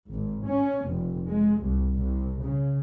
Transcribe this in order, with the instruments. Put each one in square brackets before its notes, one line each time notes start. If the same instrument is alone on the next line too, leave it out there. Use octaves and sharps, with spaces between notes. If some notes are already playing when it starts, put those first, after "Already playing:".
[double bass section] G#1
C#4
F1
G#3
C2
C2
C#3